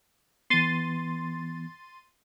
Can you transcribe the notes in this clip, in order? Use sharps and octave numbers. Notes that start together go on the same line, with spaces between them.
E3 B3 C6 A6 D#7